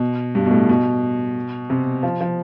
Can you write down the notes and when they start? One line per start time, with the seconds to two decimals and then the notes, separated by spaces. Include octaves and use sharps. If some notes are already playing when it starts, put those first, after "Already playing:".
Already playing: B2
0.35 G2
0.46 B2
0.51 A2
0.69 B2
1.70 C3
2.03 F3
2.21 F3